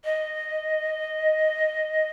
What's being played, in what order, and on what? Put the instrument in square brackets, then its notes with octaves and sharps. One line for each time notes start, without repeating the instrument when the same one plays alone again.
[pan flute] D#5